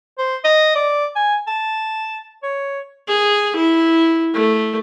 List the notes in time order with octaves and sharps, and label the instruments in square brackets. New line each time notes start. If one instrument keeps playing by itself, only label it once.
[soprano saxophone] C5
D#5
D5
G#5
A5
C#5
[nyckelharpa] G#4
E4
A3